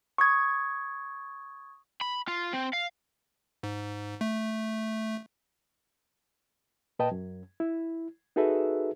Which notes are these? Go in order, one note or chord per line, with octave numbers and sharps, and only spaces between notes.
C#6 D#6 G#6
B5
F4
C4
F5
G#2
A3
A#2 B4 D#5 G5 A5
F#2
E4
D#4 F#4 G#4 A4 B4 E5